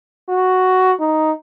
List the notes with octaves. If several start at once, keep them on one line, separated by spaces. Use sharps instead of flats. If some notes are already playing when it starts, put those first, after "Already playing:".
F#4
D#4